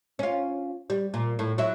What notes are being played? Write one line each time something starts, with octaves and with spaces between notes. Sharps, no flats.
C#4 F4
G3
A#2
A2
F#3 E4